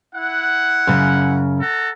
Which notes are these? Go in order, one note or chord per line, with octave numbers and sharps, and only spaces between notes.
E4 F#5
F#2 C#3
A4 F#5 A#5